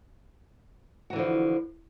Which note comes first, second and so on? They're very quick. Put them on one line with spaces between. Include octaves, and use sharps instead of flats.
F#4 E3 D3 F3